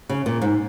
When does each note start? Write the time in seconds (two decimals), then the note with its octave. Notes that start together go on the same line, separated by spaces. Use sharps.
0.09 C#3
0.26 A#2
0.42 G#2